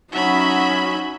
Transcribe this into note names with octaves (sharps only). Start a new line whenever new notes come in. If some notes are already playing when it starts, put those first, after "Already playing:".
F#3 C#4 D#4 F#4 E5 B5